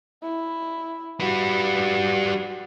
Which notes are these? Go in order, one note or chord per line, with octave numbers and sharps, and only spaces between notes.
E4
G3 F#4 B4